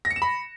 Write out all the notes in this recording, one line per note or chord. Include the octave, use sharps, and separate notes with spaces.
A#6
C#7
E7
B5